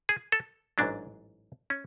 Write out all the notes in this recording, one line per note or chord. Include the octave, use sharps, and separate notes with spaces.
G#4
A4
A1 G#2 F#3 D4
C#4